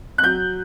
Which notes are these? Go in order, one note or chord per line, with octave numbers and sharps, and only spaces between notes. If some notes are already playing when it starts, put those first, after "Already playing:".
F#6
F#3 G6